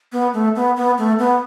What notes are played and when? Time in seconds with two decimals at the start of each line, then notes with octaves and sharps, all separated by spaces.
0.12 B3
0.33 A3
0.56 B3
0.76 B3
0.98 A3
1.19 B3